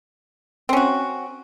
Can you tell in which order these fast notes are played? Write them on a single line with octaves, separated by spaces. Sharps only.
C4 C#4 F#4